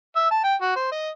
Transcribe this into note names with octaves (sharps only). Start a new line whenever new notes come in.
E5
A5
G5
F#4
C5
D#5